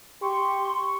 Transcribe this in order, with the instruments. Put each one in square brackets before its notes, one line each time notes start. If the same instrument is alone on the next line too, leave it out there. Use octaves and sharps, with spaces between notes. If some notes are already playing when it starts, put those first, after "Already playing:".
[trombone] G4 [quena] C6 [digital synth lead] C#6